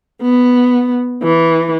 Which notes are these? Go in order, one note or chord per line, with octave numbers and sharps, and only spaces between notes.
B3
E3